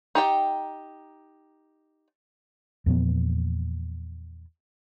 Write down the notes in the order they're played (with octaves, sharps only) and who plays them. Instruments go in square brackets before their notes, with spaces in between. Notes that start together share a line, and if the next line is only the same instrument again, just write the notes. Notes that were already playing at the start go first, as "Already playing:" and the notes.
[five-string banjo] D#4 G4 G5
[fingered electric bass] E2 A#2 F3 B3